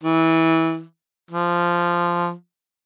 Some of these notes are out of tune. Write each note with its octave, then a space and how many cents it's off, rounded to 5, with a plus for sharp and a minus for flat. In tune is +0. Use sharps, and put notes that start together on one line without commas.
E3 -20
F3 -10